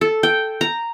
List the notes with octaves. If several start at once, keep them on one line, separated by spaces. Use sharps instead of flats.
A4
G5
A#5